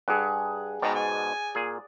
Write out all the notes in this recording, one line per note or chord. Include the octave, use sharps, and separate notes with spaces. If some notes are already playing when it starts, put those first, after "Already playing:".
G2 G#4 F#5
G#2 B2 B3 D5 G5 A#5
G#5
A#2 G#4